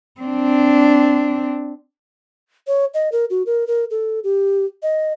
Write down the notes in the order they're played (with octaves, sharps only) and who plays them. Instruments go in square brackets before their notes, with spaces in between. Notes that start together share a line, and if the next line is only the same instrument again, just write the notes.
[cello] C4 D4
[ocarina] C#5
D#5
A#4
F#4
A#4
A#4
A4
G4
D#5